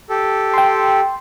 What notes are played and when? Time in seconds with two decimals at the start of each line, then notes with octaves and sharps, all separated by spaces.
0.10 G4 A4
0.54 G5 C6